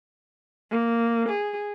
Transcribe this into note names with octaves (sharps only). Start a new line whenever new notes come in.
A#3
G#4